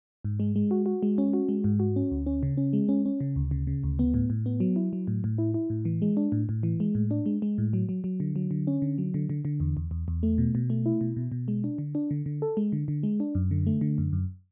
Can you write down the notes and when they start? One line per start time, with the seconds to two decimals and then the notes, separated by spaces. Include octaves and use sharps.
0.24 G#2
0.40 G#3
0.56 G#3
0.71 F#4
0.86 F#4
1.03 G#3
1.18 C#4
1.33 F#4
1.49 G#3
1.64 G#2
1.80 F#4
1.96 C#4
2.11 D2
2.26 C#4
2.43 C#3
2.57 C#4
2.73 G#3
2.89 C#4
3.05 C#4
3.21 C#3
3.36 D2
3.51 C#3
3.67 C#3
3.84 D2
3.99 B3
4.14 A2
4.30 A2
4.46 B3
4.60 F#3
4.76 E4
4.93 F#3
5.07 A2
5.24 A2
5.38 E4
5.54 E4
5.70 A2
5.85 E3
6.02 G#3
6.17 D4
6.32 A2
6.49 A2
6.63 E3
6.80 G#3
6.95 A2
7.11 D4
7.26 G#3
7.42 G#3
7.58 A2
7.73 F#3
7.89 F#3
8.04 F#3
8.20 D3
8.36 F#3
8.51 D3
8.67 C#4
8.82 D3
8.98 F#3
9.14 D3
9.30 D3
9.45 D3
9.60 E2
9.77 E2
9.91 E2
10.08 E2
10.23 A3
10.38 B2
10.55 B2
10.70 A3
10.86 E4
11.01 B2
11.17 B2
11.32 B2
11.48 G#3
11.64 D4
11.78 D3
11.95 D4
12.11 D3
12.26 D3
12.42 A4
12.57 G#3
12.72 D3
12.88 D3
13.03 G#3
13.20 D4
13.35 F#2
13.51 D3
13.67 A3
13.81 D3
13.98 F#2
14.13 F#2